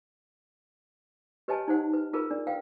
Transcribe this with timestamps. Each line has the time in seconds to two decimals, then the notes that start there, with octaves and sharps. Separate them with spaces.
1.48 G4 B4 C#5 D#5 G#5 A5
1.68 D#4 C5 F#5
1.93 B4
2.13 F4 G#4 A#4 B4
2.31 D4 D5
2.47 B4 F5 G5